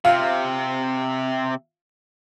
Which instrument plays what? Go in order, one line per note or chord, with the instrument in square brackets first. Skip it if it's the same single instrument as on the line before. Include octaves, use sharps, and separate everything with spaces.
[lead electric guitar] C3 C4 [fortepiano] F4 [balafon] F5